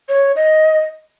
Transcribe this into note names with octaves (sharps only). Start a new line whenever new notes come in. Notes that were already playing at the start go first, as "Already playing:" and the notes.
C#5
D#5